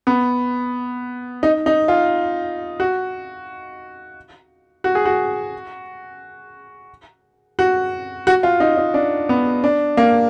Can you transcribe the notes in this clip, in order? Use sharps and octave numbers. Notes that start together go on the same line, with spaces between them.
B3
D#4
D#4
F4
F#4
F#4
G#4
F#4
F#4
F#4
F4
D#4
D#4
D4
B3
D4
A#3